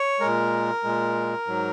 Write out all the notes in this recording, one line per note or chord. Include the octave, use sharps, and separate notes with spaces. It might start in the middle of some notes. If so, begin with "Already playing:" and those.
Already playing: C#5
A#2 G#3 A#4
A#2 G#3
G#2 F#3